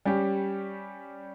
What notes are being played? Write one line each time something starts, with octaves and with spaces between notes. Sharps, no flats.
G3 C#4 G4